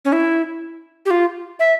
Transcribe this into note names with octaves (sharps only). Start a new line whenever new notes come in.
C#4
E4
G4
F4
E5